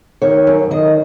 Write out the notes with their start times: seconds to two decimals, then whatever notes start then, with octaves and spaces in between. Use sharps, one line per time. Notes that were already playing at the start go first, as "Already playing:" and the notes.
0.22 D#3 C#5
0.47 F#2
0.71 D#3 D#5